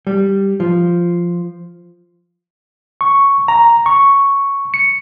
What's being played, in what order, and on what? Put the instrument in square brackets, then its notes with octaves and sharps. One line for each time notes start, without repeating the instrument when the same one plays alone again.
[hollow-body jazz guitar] G3
F3
[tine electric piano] C#6
A#5
C#6
C#7